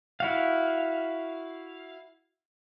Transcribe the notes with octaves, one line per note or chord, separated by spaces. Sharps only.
E4 F#4 F5